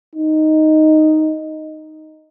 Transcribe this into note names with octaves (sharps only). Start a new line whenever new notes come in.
D#4